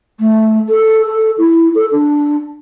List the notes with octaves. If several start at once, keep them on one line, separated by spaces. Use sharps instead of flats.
A3
A4
A4
E4
A4
D4